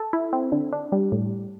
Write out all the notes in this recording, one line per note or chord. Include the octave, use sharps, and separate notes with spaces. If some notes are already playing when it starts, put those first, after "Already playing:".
Already playing: A4
E4
C4
D3
D4
G3
A2